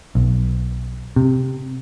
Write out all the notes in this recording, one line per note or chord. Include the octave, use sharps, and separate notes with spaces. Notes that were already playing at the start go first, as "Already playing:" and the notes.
B1
C3